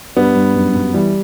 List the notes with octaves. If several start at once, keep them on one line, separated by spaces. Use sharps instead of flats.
G2 G3 B3
G2
F#2
F#2
E3 G3